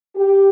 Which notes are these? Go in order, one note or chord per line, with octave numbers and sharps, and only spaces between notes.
G4